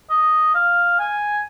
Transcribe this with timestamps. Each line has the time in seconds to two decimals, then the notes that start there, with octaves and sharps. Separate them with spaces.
0.10 D#5
0.55 F5
0.99 G#5